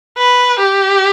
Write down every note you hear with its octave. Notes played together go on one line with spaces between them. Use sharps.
B4
G4